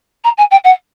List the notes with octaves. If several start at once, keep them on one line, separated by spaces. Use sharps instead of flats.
A#5
G#5
G5
F#5